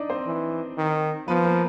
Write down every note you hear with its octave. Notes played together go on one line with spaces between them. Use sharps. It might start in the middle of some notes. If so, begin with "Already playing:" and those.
Already playing: D4 D#4 D5 D#5
C4 C5
E3
D#3
F3 B3 B4
A#3 A#4